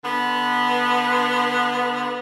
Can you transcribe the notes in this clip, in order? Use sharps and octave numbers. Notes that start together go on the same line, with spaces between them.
D3 B3